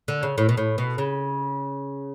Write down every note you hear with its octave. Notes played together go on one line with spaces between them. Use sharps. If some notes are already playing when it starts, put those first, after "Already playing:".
D3
C#3
A2
B2
A2
B2
C#3